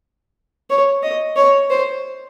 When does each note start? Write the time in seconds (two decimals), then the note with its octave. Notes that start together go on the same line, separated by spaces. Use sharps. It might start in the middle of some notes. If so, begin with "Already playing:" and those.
0.70 C#5
1.03 D#5
1.36 C#5
1.70 C5